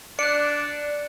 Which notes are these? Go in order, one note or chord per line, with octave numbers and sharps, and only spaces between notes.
D4 D5 F#6 C#7